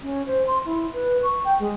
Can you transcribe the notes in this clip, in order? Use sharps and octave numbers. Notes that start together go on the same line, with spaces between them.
C#4
C5
C6
E4
B4
C#6
G5
G#3